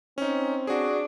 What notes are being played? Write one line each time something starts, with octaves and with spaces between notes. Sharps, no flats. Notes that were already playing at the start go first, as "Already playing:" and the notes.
C4 C#4 D#4
D4 F#4 G#4